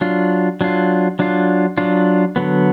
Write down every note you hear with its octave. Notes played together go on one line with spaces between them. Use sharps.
F#3 D4 F4
F#3 D4 F4
F#3 D4 F4
F#3 D4 F4
D3 F#3 B3